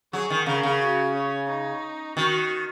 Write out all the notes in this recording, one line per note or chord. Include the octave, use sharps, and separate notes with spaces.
F#3 G#4
D#3
C#3 A#4
C#3
F#4
C#4
D#4
D#3 F#4